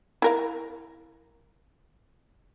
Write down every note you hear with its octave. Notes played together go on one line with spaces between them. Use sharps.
E4 A#4 F5